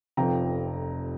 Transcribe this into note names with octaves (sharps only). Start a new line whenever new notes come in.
F1 F2 C3 F3 G5 A#5